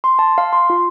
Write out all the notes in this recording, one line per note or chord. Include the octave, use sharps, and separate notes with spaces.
C6
A5
F5
C6
F4